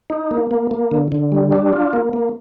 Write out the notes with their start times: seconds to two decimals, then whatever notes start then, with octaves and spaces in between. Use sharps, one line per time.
0.10 D#4
0.31 A#3
0.51 A#3
0.71 A#3
0.91 D3
1.12 D3
1.32 G3
1.52 D4
1.73 F4
1.93 A#3
2.13 A#3